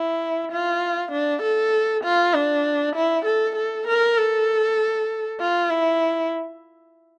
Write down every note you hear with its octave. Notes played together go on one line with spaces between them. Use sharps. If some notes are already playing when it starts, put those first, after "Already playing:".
Already playing: E4
F4
D4
A4
F4
D4
E4
A4
A4
A#4
A4
F4
E4